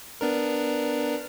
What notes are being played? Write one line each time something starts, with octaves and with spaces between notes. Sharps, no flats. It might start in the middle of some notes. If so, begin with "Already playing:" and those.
B3 D4 A#4